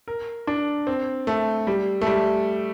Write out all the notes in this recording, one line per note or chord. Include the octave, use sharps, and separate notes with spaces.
A#4
D4
C4
A3
G3
A3
G3